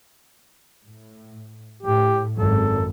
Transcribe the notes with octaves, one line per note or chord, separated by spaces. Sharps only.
A2
A2 G4
G#1 F#2 A4